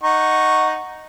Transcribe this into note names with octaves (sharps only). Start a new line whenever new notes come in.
D#4 F#5 C#6